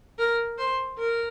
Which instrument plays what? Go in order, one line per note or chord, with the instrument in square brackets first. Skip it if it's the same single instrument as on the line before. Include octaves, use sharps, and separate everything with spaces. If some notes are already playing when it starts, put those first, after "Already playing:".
[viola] A#4
C5
A#4